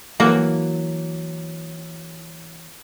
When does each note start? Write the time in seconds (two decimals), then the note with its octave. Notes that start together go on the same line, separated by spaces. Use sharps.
0.20 E3 F#3 A#3 F#4